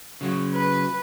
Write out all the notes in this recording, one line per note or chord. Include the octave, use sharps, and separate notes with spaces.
C#3 F#3
B4